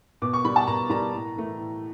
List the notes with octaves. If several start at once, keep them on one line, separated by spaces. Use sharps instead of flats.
B2 D6
C#6
G3 B5
A5
B2 A#5
G3 A#5
A2
E3 A3
A2